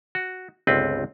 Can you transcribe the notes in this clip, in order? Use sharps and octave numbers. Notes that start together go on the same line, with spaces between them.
F#4
G1 C#2 C4 B4